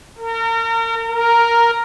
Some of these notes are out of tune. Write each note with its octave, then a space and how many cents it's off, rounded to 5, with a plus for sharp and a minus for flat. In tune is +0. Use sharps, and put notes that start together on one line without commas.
A#4 -35
A#4 +0